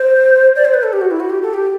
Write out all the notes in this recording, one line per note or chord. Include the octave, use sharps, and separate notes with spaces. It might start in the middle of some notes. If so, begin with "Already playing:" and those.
Already playing: C5
D5
C5
B4
A4
G4
F#4
E4
F#4
G4
A4
G4